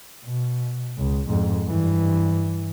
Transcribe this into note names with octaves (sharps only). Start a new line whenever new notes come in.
B2
C#2
F2 G#2
G2 E3